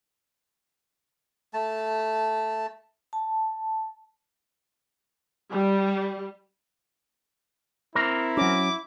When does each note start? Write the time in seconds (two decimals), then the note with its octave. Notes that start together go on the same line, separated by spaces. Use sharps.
1.54 A3 A5
3.13 A5
5.49 G3
7.95 C4 E4 A#4
8.37 F#3 C#4 D6